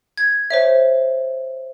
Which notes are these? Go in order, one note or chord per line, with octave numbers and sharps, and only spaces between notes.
G#6
C5 C#5 E5